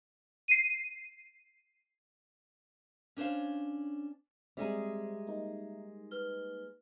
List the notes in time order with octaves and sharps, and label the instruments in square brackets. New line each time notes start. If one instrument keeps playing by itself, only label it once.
[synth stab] C7 D#7
[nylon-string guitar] C#4 D4 C5 C#5 F5
[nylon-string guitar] G3 G#3 G#4 [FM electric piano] C4 [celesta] E5 A#5
[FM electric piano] A#3 D#4
[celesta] B4 F6 G7